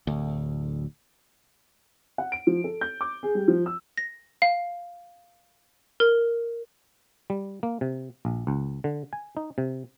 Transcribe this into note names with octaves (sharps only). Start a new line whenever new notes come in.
D1 D2
F#5
D7
F3
A4
G6
D6
G#4
G3
F3
E6
A#6
F5
A#4
G3
A#3
C3
A#1
C#2
D3
G#5
D#4
C3